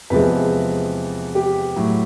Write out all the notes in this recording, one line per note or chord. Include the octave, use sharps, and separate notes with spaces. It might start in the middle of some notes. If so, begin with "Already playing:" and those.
E2 C3 F3 G#3 B4
G4
A2 F#3